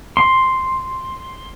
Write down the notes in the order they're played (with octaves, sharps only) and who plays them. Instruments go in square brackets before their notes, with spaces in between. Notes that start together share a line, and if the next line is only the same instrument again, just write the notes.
[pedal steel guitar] C6